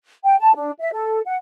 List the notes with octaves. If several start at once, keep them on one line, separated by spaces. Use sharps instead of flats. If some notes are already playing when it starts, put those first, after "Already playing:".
G5
A5
D4
E5
A4
F#5